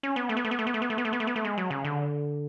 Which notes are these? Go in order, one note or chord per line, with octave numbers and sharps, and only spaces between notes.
C#4
B3
A3
B3
A3
B3
A3
B3
A3
B3
A3
B3
A3
B3
A3
B3
A3
G#3
F#3
C#3
D3